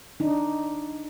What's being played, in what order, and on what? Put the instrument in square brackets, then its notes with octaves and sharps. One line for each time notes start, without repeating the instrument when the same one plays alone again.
[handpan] D4 D#4